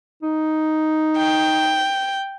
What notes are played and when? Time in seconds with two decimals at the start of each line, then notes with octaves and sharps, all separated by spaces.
0.23 D#4
1.17 G5